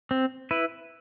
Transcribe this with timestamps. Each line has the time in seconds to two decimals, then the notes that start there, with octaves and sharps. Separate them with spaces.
0.11 C4
0.51 E4 B4